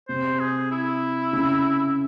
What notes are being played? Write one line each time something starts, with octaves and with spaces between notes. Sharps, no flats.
C3 C5
G#4
E4
C#3